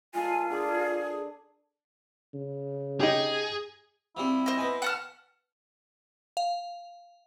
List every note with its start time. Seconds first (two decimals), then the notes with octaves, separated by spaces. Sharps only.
0.15 G#3 F4 A4 A#4 G#5
0.50 D3 G#4 D6
2.34 C#3
3.00 D#4 G4 G#4
4.17 F3 G3 C4 E4
4.46 C5 D#5
4.58 B3 B4 G#5
4.82 F#5 A5 F6
6.37 F5